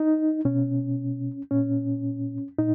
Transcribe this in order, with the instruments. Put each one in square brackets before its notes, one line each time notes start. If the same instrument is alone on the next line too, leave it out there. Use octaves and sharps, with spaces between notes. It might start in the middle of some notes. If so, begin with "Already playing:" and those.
Already playing: [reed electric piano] D#4
B2 C#4
A#2 C#4
A#2 D#4